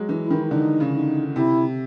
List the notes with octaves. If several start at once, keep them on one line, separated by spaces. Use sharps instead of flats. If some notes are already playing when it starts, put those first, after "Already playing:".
Already playing: F#3 G#3
E3
E4
D#3
D3 D#4
C#3
D#4
C3 E4